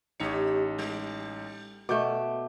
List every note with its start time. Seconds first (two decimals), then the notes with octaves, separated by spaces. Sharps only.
0.20 A1 D#4 G4 C#5 C#7
0.78 G3
1.89 B2 A3 D6 G6